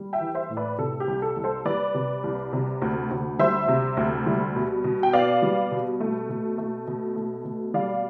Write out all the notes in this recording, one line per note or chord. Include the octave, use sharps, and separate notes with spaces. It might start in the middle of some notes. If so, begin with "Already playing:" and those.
Already playing: G3
E5 G5
E3
C5 E5
A2
B4 D5
C3 A4
G4
C2
A4
C2
A4 C5
G3 B4 D5
C3
C2
C3
D2
D2
G3 C5 E5
C3
D2
G3
B2
B2
G5
B3 D5 F5
G3
B2
A3
B2
A3
B2
A3
B2
G3 D5 F5